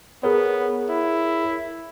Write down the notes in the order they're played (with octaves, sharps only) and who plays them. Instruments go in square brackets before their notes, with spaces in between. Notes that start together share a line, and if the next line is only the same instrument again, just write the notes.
[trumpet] B3 [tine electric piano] G#4 A#4 C#5
[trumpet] E4